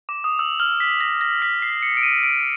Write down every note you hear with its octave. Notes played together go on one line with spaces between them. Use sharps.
D6
D#6
E6
F6
B6
A#6
A#6
B6
C7
C#7
D7
D#7
D7